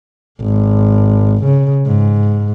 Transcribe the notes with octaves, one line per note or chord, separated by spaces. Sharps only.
G#1
C#3
G#2